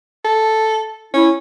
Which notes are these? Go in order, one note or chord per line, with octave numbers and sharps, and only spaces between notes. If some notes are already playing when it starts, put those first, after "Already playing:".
A4
C#4 E4